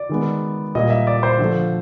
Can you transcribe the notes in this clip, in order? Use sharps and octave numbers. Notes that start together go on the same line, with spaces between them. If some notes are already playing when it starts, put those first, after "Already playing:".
Already playing: D5
D#3 G#3 B3
A#2 G3 A#3 D#5
E5
D5
C5
D3 F3 A3